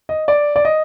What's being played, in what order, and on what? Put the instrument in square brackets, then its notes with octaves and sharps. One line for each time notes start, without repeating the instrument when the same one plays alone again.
[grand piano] D#5
D5
D5
D#5